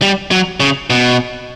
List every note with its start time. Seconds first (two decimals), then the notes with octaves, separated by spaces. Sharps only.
0.02 G3
0.31 F#3
0.60 C#3
0.90 B2